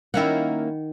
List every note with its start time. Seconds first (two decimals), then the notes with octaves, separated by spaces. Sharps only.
0.14 D#3 A#3 C#4 E4 F#5